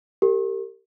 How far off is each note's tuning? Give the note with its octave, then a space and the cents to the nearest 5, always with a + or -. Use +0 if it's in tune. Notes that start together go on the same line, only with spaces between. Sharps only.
G4 +0 A#4 -35